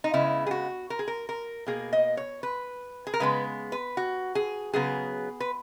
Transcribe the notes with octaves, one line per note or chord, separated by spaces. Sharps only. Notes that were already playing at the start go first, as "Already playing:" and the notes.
D#4
C#3 G#3 B3 E4
G#4
F#4
A#4
G#4
A#4
A#4
B2 A#3 G#4
D#5
C#5
B4
G#4
A#4
C#3 G#3 B3 B4
B4
F#4
G#4
C#3 F#3 B3 G#4
B4